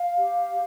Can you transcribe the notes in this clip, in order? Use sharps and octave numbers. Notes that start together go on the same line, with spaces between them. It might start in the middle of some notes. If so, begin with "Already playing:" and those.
Already playing: F5
G4